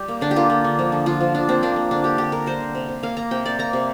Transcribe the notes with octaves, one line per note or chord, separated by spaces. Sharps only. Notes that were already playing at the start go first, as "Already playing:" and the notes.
Already playing: G3 G4
A#3
D3 D4
G4
A#3 F4
A#3
D3
F3
D3
D3 F4
F3
F3 D4
A#3 C4
A#3 D4
A#3
D3 D4
A#3 G4
D3 G4
D3 A#4
G3 C5
D3
C3
C3
A#3 F5
A#3 A#5
C3 G5
A#3 D5
A#3 A#5
C3